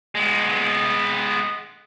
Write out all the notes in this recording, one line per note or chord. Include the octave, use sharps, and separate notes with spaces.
G#3 B3